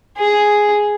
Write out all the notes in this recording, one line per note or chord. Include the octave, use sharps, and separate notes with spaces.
G#4